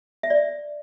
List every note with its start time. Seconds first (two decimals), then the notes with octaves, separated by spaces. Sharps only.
0.23 E5
0.30 D5
0.37 E5